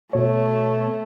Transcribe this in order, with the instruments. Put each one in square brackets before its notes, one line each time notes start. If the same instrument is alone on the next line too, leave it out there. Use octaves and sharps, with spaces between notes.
[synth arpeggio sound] B2 C#5 [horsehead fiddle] A3